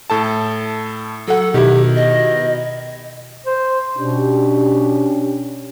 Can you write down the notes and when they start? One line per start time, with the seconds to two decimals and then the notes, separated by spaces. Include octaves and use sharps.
0.10 A2 A4 A5
1.28 F#3 A4 F#5
1.54 B2 D#3 E4 G4
1.96 D#5
3.47 C5
3.97 B2 C#4 D4 G4